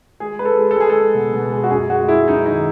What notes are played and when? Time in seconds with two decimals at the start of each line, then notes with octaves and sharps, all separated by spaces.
0.20 G#3 G#4
0.39 G#3 B4
0.45 A4
0.59 G#3
0.71 A4
0.76 G#3 G#4
0.90 A4
0.95 G#3
1.15 B2
1.33 B2
1.52 G#3
1.64 F#4
1.70 F#2 G#4
1.89 G#3 F#4
2.08 G#3 E4
2.27 F#2 D#4
2.46 D#3 D#4